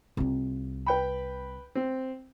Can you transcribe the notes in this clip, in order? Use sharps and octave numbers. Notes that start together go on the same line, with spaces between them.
C2 F4
B4 G5 B5
C4